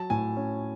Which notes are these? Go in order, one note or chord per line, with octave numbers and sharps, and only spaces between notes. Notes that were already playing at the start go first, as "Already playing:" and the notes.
Already playing: F#3 A5
A2 G#5
C#4